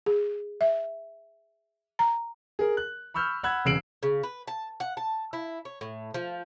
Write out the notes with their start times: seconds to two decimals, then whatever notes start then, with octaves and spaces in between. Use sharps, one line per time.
0.06 G#4
0.61 E5
1.99 A#5
2.59 G#4 A#4
2.77 F#6
3.14 B5 C#6 E6 F6 G6
3.43 F#5 B5 E6 F#6 G#6
3.65 E1 C#3 E6 C7 D7 F#7
4.03 C#3
4.23 B4
4.47 A5
4.80 F#5
4.97 A5
5.33 E4
5.65 C#5
5.81 A2
6.14 F3